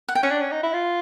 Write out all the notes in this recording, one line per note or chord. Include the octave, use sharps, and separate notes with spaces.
F#5
G5
C#4 F#5
D4
C#4
D#4
E4
F4